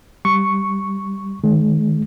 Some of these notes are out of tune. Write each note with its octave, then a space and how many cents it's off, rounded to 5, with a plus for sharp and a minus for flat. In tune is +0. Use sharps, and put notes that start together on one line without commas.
G3 +0 C#6 +0
D#3 +0 G#3 +40